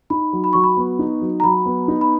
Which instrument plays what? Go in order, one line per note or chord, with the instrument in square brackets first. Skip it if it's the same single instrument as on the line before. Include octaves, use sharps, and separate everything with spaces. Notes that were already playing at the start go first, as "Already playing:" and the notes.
[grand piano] D#4 [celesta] B5
[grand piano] F#3
[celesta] B5
[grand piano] F#3 [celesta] C#6
[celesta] B5
[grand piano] B3
D#4
F#3
[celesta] A#5
[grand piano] F#3 [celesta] B5
[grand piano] B3
D#4
[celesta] B5